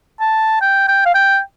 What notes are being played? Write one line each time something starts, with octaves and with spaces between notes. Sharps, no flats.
A5
G5
G5
F5
G5